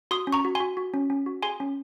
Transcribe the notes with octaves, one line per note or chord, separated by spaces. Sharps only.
F#4 C6 D#6
C#4
A#5 C#6
F#4
F#4 G#5 C6
F#4
C#4
C#4
F#4
G#4 G#5 C6
C#4